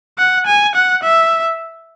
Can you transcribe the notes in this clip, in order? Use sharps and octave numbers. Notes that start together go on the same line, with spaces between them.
F#5
G#5
F#5
E5